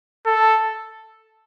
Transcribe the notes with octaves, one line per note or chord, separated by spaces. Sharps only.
A4